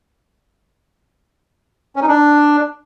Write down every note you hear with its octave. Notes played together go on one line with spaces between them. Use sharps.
C#4
D#4
D4